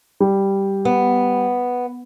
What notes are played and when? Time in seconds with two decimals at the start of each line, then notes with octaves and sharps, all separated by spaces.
0.20 G3
0.85 B3